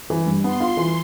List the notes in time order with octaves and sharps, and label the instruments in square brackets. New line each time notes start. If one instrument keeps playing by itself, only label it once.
[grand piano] E3
G2
[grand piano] B3 [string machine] C6
[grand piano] F4
E3